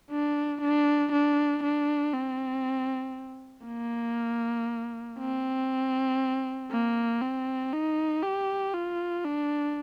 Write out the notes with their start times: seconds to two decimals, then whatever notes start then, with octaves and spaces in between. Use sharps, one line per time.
0.11 D4
0.62 D4
1.12 D4
1.64 D4
2.14 C4
3.67 A#3
5.19 C4
6.72 A#3
7.22 C4
7.73 D#4
8.23 G4
8.74 F4
9.25 D4